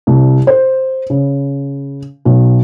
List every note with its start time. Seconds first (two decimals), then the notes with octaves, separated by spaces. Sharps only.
0.07 C2
0.47 C5
1.10 C#3
2.25 B1